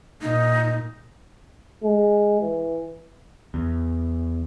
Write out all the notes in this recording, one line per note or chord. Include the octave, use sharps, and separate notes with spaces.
A#2 D#4
G#3
E3
E2